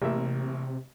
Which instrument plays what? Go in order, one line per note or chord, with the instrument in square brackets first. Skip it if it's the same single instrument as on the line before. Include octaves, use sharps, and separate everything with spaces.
[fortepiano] A1 A#3 E5 [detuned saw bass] C3